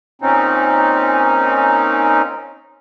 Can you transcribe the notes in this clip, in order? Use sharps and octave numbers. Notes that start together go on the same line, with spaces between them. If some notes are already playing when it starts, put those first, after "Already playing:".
A#2 C4 C#4 D#4